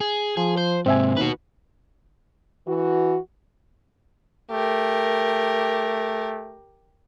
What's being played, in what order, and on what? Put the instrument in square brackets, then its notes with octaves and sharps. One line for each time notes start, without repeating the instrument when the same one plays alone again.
[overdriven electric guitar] G#4
[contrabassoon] F3 [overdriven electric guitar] G#4
[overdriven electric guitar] C5
[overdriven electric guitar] G#2 C3 [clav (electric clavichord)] C4 E5 G#5
[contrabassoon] D#2 [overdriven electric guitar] F#4 B4
[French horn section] E3 F#4
[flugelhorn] A3 [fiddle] G4 A#4